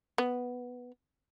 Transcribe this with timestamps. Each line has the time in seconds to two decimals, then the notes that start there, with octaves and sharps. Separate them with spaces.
0.18 B3